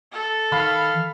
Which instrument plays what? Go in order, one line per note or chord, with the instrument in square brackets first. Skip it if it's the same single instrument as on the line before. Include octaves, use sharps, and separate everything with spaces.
[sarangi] A4
[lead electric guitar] D#3 [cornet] F5 [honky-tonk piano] B5